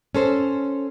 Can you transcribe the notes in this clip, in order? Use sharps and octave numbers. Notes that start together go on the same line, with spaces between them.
C#4 A4 C5